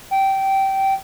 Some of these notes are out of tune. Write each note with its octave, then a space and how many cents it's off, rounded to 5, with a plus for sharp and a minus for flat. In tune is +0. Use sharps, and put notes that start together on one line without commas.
G5 -15